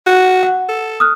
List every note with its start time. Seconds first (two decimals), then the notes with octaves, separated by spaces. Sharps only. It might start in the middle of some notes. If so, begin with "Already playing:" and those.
0.06 F#4
0.43 F#5
0.69 A4
1.00 D#6 F6 F#6